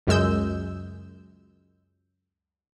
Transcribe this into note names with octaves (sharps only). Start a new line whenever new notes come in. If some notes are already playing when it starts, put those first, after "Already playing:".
C#2 F#2 G#3 E6 G6